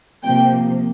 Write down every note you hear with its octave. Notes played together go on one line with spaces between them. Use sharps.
C3 F3 A#3 G5